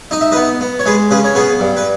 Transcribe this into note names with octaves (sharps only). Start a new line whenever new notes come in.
D#4 D#5
E5
B3 B4 D#5
B3
C#5
G#3 G#4 B4
C#3 G#4 B4
C#5
B3 G#4 B4
G2
B4